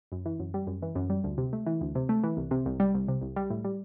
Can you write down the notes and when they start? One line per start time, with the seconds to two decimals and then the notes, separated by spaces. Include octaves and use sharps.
0.12 F#2
0.26 E3
0.39 F#2
0.54 G3
0.67 F#2
0.82 E3
0.95 F#2
1.10 G3
1.24 D2
1.38 C3
1.53 A3
1.66 E3
1.81 D2
1.95 C3
2.09 A3
2.24 E3
2.37 C2
2.51 C3
2.66 C2
2.80 G3
2.94 C2
3.08 C3
3.22 C2
3.36 G3
3.50 A2
3.65 G3